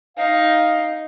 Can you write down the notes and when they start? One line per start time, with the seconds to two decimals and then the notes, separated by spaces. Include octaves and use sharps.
0.17 D#4 F5